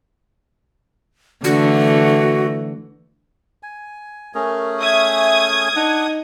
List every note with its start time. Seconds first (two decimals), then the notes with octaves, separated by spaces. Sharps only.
1.44 D3 E3 A3 F#4
3.63 G#5
4.35 A3 C#4 G#4 A#4
4.81 E5 D#6 G#6
5.76 D4 D#4 F#5